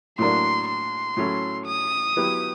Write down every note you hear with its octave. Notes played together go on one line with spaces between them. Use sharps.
A2 F#3 A#3 D4 C6
C6
A2 F#3 A3 C#4 E4
D#6
F#3 B3 E4 G4